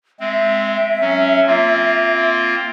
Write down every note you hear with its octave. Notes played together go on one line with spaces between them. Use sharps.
G#3 C4 E5
F#3 C#4
A#3 C4 F4